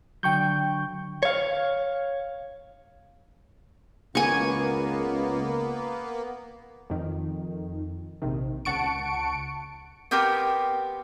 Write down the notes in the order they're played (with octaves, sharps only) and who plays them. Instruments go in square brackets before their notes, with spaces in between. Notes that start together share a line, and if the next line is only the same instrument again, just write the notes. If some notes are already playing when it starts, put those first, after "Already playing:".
[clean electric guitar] D3 F#3 [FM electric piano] G5 C#6 G6
[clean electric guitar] C#5 F5
[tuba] C#2 [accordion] A#3 B3 [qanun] G#5 C#6
[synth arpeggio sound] F2 D#3
A#1 C3 D#3
C#2 F#5 A5 C#6 C#7 D7
[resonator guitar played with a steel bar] B3 C4 G4 A#4 G5